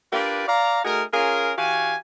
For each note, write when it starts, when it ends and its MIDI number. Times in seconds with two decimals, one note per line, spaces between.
0.13 0.47 62
0.13 0.47 65
0.13 0.47 67
0.13 0.47 70
0.13 0.47 71
0.13 0.47 74
0.48 0.80 74
0.48 0.80 77
0.48 0.80 82
0.85 1.03 57
0.85 1.03 63
0.85 1.03 66
0.85 1.03 68
0.85 1.03 70
1.14 1.53 61
1.14 1.53 65
1.14 1.53 68
1.14 1.53 70
1.58 1.96 52
1.58 1.96 66
1.58 1.96 67
1.58 1.96 77
1.58 1.96 80